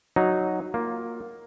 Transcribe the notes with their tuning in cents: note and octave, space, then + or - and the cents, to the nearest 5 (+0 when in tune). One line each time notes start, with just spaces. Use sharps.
F#3 +0 D#4 +0
A#3 +0 F4 +20